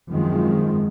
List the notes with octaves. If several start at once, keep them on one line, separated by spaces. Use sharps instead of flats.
G#1 F#2 D#3 F3 G#3 C4